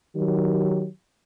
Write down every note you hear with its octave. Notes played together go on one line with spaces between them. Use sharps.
D#3 F#3 G4